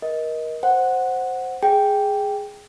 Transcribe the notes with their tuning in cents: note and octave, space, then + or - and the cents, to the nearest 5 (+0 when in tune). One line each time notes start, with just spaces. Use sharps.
A#4 +25 D#5 +15
C5 +0 F#5 +0
G#4 +0 G5 +0